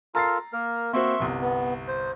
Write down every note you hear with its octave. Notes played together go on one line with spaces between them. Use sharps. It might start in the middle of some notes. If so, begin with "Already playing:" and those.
F4 A4 A#4 A#5 A6 C7
A#3 A#4
A#3 C4 F#4 E5 C6 C#6
G1 C2
B3
C5